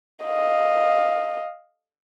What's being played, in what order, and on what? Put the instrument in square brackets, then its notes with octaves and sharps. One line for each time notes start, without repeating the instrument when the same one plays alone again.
[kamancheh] D#5 F5